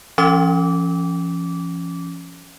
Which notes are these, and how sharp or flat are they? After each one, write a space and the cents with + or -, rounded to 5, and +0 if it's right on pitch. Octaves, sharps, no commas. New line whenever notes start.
F3 -40 C#4 +0 D6 -20